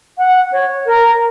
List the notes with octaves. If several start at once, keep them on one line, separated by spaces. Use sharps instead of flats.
F#5
C#5
A#4